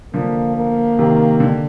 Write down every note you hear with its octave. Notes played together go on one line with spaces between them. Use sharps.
D3 F3 A#3
A#3
C3 D#3
D3